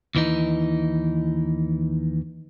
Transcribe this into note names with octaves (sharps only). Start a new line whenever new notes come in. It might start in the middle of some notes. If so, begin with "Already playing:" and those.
D#2 E3 D#4